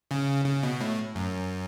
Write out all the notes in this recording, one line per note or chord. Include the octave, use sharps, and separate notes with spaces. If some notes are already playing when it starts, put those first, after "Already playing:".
C#3
C#3
B2
A2
F#2